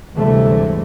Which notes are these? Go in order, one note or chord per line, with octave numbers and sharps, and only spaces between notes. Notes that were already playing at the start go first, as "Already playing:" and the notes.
D2 G2 C3 E3 G#3 A3